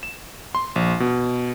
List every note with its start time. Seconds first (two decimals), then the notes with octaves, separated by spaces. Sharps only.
0.03 E7
0.55 C6
0.76 A#1
1.00 B2